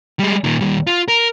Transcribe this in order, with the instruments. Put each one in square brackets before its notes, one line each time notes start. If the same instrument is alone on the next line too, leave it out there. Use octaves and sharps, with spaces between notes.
[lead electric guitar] G3 G#3
A#2 D#3
D#2 G3
F4
A#4